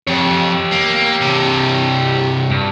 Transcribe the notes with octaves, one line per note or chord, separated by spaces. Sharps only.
F2 G4 C#5
A#3
G2 C3
G2